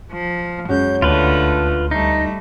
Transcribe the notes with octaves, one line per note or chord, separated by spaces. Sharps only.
F3
F#2 G#3 C#4 F#4 G6
D2 D3 A3 F4 B4
G3 A3 D#4 C7